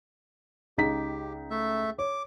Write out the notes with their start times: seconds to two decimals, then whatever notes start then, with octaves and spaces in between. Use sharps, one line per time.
0.78 C#2 D#4 G4 B6
1.50 A3 E5
1.99 C#5 D6